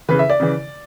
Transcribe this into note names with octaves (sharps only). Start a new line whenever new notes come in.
C#3 E3 B4
E5
D5
C#3 E3